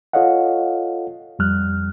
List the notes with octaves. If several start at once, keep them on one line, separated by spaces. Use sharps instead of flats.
F4 A4 C#5 D#5 F5 F#5
F2 G3 F6 F#6